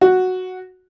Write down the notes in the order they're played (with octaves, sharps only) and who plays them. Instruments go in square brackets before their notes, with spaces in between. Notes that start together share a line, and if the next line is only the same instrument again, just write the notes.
[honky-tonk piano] F#4